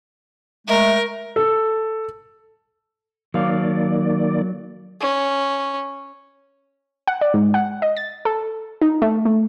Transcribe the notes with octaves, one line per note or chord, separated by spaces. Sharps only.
G#3 A3 A#4
A4
D#3 F#3 A#3 D5 F5
C#4
F#5
D5
G#2
F#5
D#5
A6
A4
D#4
A3
A3